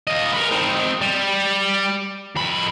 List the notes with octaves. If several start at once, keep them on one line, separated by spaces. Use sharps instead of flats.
F4 D#5
A#4 B4
C4 D#4
G3
F2 B5